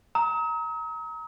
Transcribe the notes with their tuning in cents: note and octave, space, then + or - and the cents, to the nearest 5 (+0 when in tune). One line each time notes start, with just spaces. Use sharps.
A#5 +0 D#6 +45